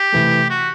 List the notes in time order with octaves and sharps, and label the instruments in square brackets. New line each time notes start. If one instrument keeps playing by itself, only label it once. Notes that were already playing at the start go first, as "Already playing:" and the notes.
Already playing: [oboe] G4
[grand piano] C3 E3 A3
[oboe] F#4